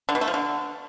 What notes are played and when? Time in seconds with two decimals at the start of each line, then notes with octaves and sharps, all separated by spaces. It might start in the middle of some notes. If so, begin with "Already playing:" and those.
0.09 D3
0.15 B2
0.21 A3
0.28 F3
0.34 D3